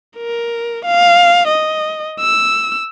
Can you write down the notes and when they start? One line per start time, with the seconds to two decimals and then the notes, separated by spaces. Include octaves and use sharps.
0.17 A#4
0.85 F5
1.48 D#5
2.20 E6